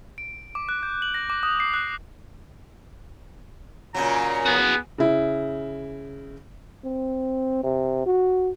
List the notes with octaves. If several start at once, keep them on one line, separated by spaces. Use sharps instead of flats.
D7
D6
F#6
G6
F#7
A#6
D6
D#6
C7
F#6
A#2 C#3 F#3 A#5
B3 F#4 G#4
C#3 E4
C4
C3
F#4